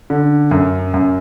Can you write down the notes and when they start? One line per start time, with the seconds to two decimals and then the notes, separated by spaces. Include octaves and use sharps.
0.10 D3
0.51 F#2
0.94 F#2